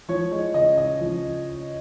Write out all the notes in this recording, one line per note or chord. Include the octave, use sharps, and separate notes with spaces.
F3 C#5
G#3 C#5
C#3 D#5
C#3 D#5
F3